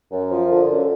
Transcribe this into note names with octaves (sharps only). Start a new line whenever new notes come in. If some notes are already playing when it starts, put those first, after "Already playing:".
F#2
F3
D3
F#2